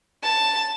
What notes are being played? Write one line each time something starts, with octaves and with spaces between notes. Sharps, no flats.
A5